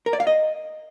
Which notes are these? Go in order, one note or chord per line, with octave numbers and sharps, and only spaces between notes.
A#4
D5
F5
D#5